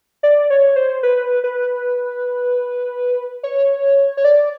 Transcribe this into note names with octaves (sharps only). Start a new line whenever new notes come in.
D5
C#5
C5
B4
B4
C#5
C#5
D5